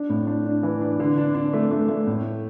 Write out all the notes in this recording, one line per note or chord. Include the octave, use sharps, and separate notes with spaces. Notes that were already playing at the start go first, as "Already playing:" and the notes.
Already playing: D4
A2
D4
D4
E3
D4
D3
D4
D4
A3
A3
A3
A2